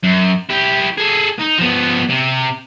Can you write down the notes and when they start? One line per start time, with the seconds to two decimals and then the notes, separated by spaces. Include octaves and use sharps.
0.03 F#2
0.49 E4 G4
0.97 G#4 A4
1.39 D#4
1.58 F3 B3
2.09 C3